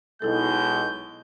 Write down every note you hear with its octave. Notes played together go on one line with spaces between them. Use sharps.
B1 B2 G#3 D#4 E4 A4 G6